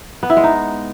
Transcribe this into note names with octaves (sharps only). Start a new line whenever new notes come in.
B3
E4
G#3
D#4